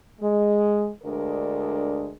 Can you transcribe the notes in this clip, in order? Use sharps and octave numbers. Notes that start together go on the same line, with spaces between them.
G#3
D2 G#3 D4 A#4